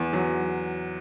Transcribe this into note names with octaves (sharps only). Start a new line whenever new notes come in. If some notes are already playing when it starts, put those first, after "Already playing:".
Already playing: E2
F#3